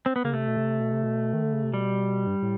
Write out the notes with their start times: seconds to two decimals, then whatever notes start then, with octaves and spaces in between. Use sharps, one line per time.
0.06 C4
0.16 B3
0.24 C#3 A#3
0.33 C3 A3
0.47 B2
0.57 C3
0.80 B2
0.92 C3
1.03 B2
1.33 D#3
1.43 D3
1.53 C#3
1.64 C3
1.73 B2 G3
2.27 G2
2.42 A2